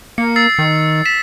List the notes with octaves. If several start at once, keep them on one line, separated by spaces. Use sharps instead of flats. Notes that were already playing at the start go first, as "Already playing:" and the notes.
A#3 C#7
E6 A6 C7
D#3
B6 E7